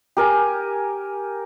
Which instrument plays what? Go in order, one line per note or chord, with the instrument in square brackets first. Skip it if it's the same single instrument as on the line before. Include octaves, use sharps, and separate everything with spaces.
[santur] G4 A#4 G#5 A#5